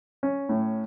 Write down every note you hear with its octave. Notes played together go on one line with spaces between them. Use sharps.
C#4
A2